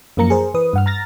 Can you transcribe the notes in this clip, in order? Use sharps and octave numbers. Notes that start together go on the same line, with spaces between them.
F#2 F3 A#3 A#5 C#7
G#4 A#4 C5
E3 B4 D#6
G2 F#5 F6
A#5 F6 A6 A#6